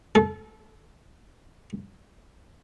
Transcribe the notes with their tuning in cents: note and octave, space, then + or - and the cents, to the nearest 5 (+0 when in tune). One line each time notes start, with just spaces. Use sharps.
A4 -30